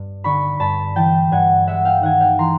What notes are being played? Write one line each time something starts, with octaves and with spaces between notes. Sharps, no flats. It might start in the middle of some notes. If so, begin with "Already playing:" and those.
Already playing: G2
D3 B5 C#6
G2 A5 B5
E3 G5 A5
G2 F#5 G#5
G#3 E5 F#5
F5 G5
D#3 F#5 G#5
F5 G5
E3 A#5 C6